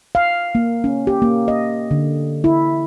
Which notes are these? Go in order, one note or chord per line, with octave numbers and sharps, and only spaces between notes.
F5
A#3
C#4
G4
A#3
D#5
D3
E4